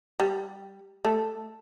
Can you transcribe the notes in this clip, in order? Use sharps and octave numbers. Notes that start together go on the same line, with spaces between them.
G3
A3